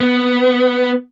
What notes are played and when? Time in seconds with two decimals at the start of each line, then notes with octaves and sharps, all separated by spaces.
0.01 B3